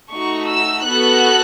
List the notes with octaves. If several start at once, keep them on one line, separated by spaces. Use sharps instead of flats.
A3 D#4 F#4 C#6
E6
B3 F#4 A4 F#6